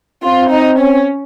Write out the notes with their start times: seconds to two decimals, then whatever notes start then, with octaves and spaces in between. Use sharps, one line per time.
0.24 C4 F4
0.51 D#4
0.80 C#4